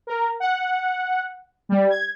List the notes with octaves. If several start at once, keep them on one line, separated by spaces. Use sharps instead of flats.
A#4
F#5
G3
G#6